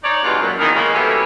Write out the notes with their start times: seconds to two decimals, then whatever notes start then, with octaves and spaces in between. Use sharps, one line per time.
0.04 D#4 C#5 D5
0.24 G2 B2 E3 G#3 F4
0.40 F#2 A#2
0.59 E2 D#3
0.75 C#3 G#3 A#3
0.94 F#3 A3 B3 C#4 E4 G4